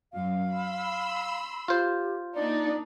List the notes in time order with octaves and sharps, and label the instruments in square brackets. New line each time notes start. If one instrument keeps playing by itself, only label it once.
[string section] F#2 F#3 [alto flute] F5
[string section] B5 C6 E6
[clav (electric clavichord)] F4 C5 [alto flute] G4
[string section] A#3 D4 D#4 [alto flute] D5